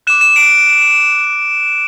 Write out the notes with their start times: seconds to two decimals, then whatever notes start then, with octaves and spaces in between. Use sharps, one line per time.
0.07 D6 F#6 E7
0.21 E7
0.36 D7